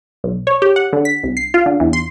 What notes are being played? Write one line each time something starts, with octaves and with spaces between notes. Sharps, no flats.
B1
C#5
G4
F#5
D3
B6
C2
C7
F4
D3
E2
C6